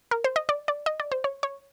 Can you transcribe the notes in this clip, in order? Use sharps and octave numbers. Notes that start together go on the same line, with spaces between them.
A#4
C5
D#5
D5
D5
D#5
D5
C5
C#5
C#5